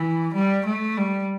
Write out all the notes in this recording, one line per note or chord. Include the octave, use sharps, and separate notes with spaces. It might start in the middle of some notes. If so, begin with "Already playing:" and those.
Already playing: E3
G3
A3
G3